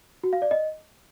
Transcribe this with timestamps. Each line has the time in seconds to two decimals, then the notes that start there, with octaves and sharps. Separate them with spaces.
0.24 F#4
0.33 F5
0.42 D5
0.51 D#5